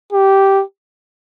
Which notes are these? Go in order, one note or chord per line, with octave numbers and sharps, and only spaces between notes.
G4